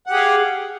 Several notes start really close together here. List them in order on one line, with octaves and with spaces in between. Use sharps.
F#5 G4 G#4 F5